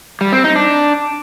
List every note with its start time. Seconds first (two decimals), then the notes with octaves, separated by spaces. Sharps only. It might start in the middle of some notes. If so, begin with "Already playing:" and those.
0.21 G3
0.32 C4
0.44 D#4
0.56 D4